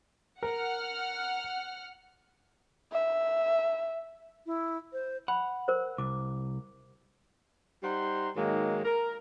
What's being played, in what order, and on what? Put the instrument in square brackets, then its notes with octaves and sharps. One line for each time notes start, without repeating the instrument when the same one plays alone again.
[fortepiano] A#4 [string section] F#5 F6
[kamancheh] E5
[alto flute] E4
C5
[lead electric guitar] F#5 [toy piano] B5
[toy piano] A#4 C5
[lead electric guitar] C2 [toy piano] D6
[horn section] G3 D#4 C5 F#5 A#5 C6
G#2 D#3 F#3 G#3 A#3
A#4